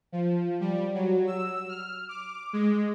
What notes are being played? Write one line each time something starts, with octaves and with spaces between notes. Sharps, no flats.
F3
G3
F#3
E6
F6
D6
G#3